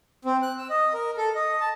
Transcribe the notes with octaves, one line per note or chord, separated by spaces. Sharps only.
C4
F#6
E6
D#5
A#4
A4
D#5
A5